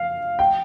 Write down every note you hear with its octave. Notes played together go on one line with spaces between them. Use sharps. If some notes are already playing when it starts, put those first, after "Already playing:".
Already playing: F5
G5